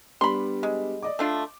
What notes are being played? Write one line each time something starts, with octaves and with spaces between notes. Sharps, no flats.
G3 B3 D4 B5 C6
G#3
D5 D#5 D6
A3 D4 F4